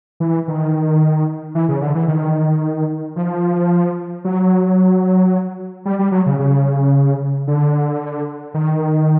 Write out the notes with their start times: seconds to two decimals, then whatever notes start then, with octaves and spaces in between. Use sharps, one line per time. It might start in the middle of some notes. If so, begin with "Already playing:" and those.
0.20 E3
0.48 D#3
1.55 E3
1.69 C#3
1.81 D3
1.95 E3
2.08 D#3
3.16 F3
4.25 F#3
5.85 G3
5.99 G3
6.12 F#3
6.26 C#3
6.39 C#3
7.47 D3
8.54 D#3